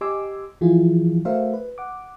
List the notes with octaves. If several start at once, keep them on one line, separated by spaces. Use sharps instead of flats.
G4 D#5 G#5 C6 D6 E6
E3 F3 E4 F4 G#4
A3 F#4 A#4 C5 E5 F5
B4
F#5 D6